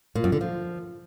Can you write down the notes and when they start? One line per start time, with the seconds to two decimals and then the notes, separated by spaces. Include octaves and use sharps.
0.15 A#2
0.24 F#2
0.32 D3
0.41 F3